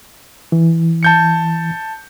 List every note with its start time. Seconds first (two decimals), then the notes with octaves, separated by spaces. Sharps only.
0.52 E3
1.03 A5 G6 C#7